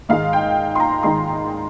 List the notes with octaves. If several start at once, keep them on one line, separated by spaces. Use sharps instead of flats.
G#2 D#3 G#3 F5
G5
C6
A#5
G#2 D#3 G#3 C6